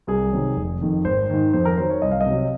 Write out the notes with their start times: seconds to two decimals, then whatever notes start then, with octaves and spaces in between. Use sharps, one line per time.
0.07 C2 G#4
0.32 C3 D#3 F#3
0.56 F1
0.81 F2 D#3
1.05 G#1 C5
1.30 G#2 D#3
1.53 F2 C5
1.65 A#4
1.77 D#3 F#3 C5
1.90 C#5
2.02 C2 D#5
2.11 F5
2.21 D#5
2.26 C3 F#3